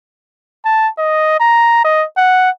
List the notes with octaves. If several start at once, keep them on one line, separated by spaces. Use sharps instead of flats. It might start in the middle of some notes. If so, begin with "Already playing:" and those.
A5
D#5
A#5
D#5
F#5